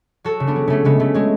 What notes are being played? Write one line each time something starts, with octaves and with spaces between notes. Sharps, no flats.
F#3 F#4 A4
C#3
B3 D4
F#3
C#3 A3 C#4
C#3 G#3 B3
C#3 A3
F#3 G#3